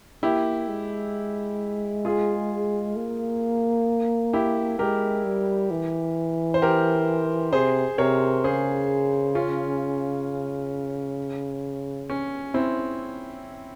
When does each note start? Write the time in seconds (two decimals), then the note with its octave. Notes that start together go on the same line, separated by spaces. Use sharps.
0.23 A#3 E4 G4
0.69 G#3
2.05 F4 G#4
2.96 A#3
4.33 E4 G4
4.79 G#3 G4 A#4
5.24 G3
5.71 E3
6.54 C5
6.62 G4 A#4
7.53 C3 G#4 C5
7.98 C3 A#4 C#5
8.44 C#3 G#4 C5
9.35 C#4 F4
12.10 C#4
12.54 C4 E4